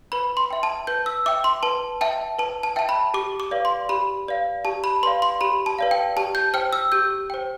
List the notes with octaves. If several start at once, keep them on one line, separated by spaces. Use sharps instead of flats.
B4 B5
C6
E5 G5
A5
B4 G6
E6
E5 G5 D6
C6
B4 A5
E5 G5 A5
B4 A5
A5
E5 G5 A5
B5
G4 D6
D6
B4 D5 F5
C6
G4 B5
B4 D5 F5
G4 A5
B5
B4 D5 F5 C6
C6
G4 B5
A5
B4 D5 F5
G5
G4 A5
G6
C5 G5 F6
E6
G4 G6
C5 G5